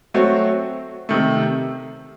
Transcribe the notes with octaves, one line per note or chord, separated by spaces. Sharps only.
F#3 A3 C4 F#4 C#5
C3 D#3 A3